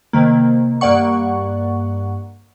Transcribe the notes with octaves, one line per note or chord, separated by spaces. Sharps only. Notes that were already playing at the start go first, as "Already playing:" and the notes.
C3 D#3 A#3
G2 A#3 D5 F#5 C#6